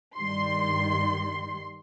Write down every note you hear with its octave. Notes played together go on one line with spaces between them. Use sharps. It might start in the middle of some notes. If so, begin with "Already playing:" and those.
G2 D#3 G3 C6